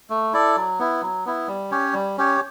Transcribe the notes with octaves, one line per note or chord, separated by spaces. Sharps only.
A3
E4 A4 D5
F#3
B3 E4
F#3
B3 E4
G3
C#4 G4 C#5
G3
C#4 G4 C#5